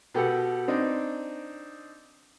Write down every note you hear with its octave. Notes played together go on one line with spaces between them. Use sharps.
B2 G4 A4 F#5
C4 D4 D#4